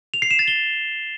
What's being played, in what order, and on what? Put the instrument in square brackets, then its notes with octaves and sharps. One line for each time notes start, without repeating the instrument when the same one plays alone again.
[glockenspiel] F7
C7
E7
A6
G7